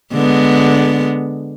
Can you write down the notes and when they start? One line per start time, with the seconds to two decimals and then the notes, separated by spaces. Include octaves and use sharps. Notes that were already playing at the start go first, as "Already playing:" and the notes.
0.13 D3 G#3 B3